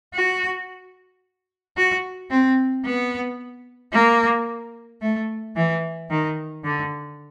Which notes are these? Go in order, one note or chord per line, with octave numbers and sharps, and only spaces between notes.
F#4
F#4
C4
B3
A#3
A3
E3
D#3
D3